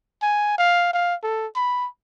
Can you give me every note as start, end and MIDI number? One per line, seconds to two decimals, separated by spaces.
0.22 0.57 80
0.58 0.92 77
0.93 1.15 77
1.23 1.47 69
1.56 1.87 83